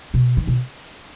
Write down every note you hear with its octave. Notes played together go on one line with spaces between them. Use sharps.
B2
D#3
B2